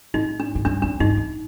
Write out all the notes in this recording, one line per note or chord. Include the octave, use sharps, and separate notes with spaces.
A2 D#4
D4
A2
G2 D4
F2 D4
G2 D#4
A2